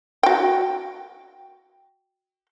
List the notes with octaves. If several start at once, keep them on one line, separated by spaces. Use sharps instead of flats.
F#4 G5